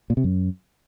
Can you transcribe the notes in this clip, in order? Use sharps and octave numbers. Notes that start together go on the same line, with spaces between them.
A#2
C3
F#2